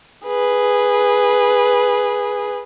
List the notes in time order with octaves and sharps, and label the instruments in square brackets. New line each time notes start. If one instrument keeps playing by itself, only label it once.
[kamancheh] G#4 B4